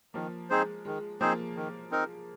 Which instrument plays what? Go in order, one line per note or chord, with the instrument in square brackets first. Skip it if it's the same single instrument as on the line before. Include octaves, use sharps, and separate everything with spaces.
[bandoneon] D#3 [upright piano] F3 A#3
[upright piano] G#3 [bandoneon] C4 D#4 G#4 C5
[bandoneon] D#3 [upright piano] G#3
[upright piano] F3 A#3 [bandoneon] C4 D#4 G#4 C5
[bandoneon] D#3
C4 D#4 A#4